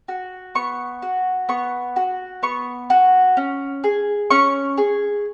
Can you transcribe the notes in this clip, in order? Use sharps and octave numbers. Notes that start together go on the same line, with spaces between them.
F#4
B3 C#6
F#4
B3 C#6
F#4
B3 C#6
F#4
C#4
G#4
C#4 C#6
G#4